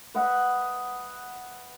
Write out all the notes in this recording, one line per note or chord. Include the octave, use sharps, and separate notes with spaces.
B4 D#5 E5 F#5